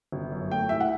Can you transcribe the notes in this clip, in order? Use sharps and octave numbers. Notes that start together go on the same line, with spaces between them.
G1
F#2
A3 G5
C2 E5
F#5